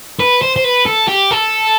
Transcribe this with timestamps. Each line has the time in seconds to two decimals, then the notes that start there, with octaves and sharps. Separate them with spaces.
0.19 B4
0.42 C5
0.56 C5
0.64 B4
0.86 A4
1.08 G4
1.31 A4